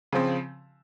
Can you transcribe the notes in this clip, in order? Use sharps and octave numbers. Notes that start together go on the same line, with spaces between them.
C#3 F3 C4